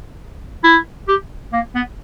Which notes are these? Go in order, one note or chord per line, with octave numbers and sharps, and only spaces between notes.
E4
G4
A#3
B3